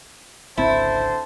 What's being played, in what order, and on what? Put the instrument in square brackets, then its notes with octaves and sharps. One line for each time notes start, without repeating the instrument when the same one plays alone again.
[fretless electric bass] G#1 C#2 C4 [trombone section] D3 C5 [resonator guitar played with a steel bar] E4 [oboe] A5